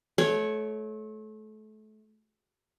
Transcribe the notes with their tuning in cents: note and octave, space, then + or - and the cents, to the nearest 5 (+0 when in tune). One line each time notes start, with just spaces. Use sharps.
A3 -30 C#5 +0